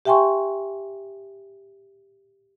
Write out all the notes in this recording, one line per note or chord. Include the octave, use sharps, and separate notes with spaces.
G4 E5 G5 G#5 C6 C#6